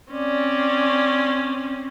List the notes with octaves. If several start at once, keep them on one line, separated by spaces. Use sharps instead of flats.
C4 C#4 D5